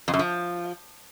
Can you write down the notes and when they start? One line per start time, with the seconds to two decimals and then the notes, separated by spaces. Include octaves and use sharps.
0.08 F2
0.14 F#2
0.19 F3